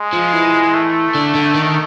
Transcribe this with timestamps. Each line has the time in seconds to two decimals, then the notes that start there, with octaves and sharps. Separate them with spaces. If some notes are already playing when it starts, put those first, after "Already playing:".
Already playing: G#3
0.13 F3
0.33 E3
0.74 A3
1.14 D3
1.35 D3
1.54 D#3